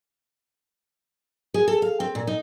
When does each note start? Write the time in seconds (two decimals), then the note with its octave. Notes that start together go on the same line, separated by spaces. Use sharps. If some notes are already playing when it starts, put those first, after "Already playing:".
1.54 G#4
1.68 A4
1.82 F5
2.00 C4
2.15 A#2
2.27 D#4